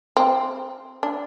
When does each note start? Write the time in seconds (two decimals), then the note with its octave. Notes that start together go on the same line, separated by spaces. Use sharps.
0.17 C4
1.03 D4